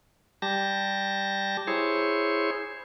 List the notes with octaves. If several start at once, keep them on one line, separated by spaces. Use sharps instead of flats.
G3 G4 A5 A#6
E4 G#4 C5 C#5